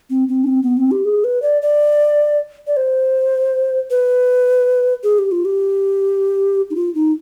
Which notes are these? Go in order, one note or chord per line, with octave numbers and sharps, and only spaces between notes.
C4
C4
D4
C4
B3
C4
G4
G#4
B4
D5
D5
D5
C5
B4
G#4
G4
F4
G4
D#4
F4
D#4